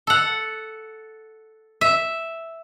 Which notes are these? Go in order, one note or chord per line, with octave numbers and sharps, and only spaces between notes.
A4 F#5
E5